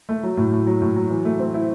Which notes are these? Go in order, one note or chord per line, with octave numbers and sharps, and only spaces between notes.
A3
F#3
A2
A2
F#3
A2
F#3
E3
A3
C4
E4